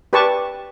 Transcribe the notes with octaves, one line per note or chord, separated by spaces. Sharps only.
G4 B4 D5 A5 C#6